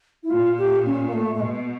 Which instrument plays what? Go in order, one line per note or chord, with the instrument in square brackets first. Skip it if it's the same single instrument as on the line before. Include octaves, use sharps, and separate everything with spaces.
[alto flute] E4
[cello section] A#2 [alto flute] F4
[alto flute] G4
C#4
A#3
A3
A3
[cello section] B2 [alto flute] G#3